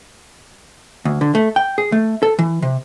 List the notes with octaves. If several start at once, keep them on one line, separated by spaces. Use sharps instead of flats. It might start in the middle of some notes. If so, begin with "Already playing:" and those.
D2
D3
A3
G5
G#4
A3
A4
E3
C3